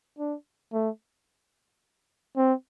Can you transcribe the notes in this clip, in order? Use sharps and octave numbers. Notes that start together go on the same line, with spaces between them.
D4
A3
C4